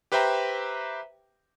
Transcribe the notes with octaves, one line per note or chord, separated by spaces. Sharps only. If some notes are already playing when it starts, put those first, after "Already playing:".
G4 B4 C5 E5 G5 A#5